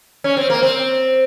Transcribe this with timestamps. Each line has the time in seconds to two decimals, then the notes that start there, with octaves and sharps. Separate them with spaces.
0.24 C#4
0.37 C4
0.50 A#3
0.63 C4